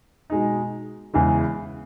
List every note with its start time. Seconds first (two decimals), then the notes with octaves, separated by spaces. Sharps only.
0.30 B2 G#3 D#4
1.14 E2 C#3 E3 G#3